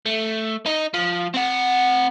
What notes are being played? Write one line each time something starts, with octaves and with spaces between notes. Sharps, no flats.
A3
D#4 D#5
F3
C4 F#5